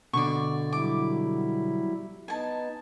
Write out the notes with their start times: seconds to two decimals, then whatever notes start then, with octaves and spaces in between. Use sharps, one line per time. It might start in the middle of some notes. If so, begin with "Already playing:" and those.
0.13 B2 D3 D5 C#6
0.73 F#3 G3 E4 D6
2.28 B3 D#4 G#5 A5